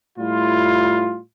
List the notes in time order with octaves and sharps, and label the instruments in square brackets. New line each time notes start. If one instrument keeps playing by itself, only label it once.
[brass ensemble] A2 G3 E4 F4